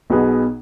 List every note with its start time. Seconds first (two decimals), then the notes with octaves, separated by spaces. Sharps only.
0.10 B1 B2 B3 G#4